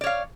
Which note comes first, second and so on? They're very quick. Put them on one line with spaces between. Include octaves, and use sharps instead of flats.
D5 C#5 F5